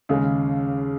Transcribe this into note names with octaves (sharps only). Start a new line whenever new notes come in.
D#2 C#3 G#3 C#4